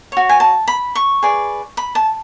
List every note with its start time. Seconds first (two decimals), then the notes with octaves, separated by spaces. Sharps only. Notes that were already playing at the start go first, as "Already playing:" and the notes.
0.12 F#4 C#5
0.29 G#5
0.40 A5
0.68 B5
0.95 C#6
1.23 G#4 B4 D5
1.77 B5
1.95 A5